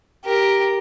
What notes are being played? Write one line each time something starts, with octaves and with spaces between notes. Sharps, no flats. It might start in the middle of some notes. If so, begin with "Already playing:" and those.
G4 A#4